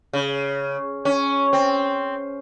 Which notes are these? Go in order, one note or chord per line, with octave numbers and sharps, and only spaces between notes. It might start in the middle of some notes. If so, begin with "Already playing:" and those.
C#3
C#4
C4